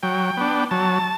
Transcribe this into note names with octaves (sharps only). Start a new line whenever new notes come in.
F#3 G5
B3 D4
F#3 A5